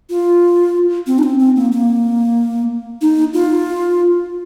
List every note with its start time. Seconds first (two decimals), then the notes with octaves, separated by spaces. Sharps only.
0.10 F4
1.07 C4
1.19 D#4
1.23 C4
1.39 C4
1.56 A#3
1.72 A#3
3.01 D#4
3.34 F4